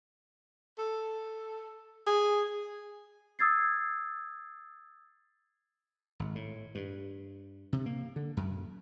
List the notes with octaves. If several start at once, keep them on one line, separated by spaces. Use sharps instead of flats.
A4
G#4
D#6 E6 G#6 A6 C7
G#1
A2
G2
C3
A#3
D3
F#2